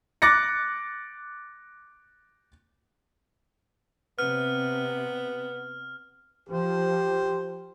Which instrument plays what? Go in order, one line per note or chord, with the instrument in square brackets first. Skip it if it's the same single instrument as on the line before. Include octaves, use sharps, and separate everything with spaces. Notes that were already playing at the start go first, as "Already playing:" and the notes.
[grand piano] D6 F#6 A6 A#6 C#7
[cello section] C3 [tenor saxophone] B3 [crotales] F6
[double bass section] F3 [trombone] G4 [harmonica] C5